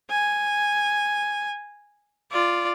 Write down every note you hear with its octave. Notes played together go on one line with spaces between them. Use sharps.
G#5
F4 D5